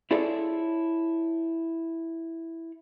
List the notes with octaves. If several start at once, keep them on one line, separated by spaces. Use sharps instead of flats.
E4 F4 G#4 A4 C#5 D5